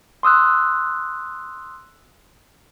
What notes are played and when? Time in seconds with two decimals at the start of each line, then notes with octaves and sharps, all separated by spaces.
0.23 C6 D#6 E6 F#6